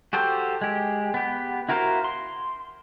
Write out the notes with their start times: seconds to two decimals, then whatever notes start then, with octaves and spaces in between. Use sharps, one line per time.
0.13 F#4 G4 A4 C5
0.61 G#3 G4
1.14 B3 G4
1.69 E4 F#4 A#4 C5 F5
2.04 C6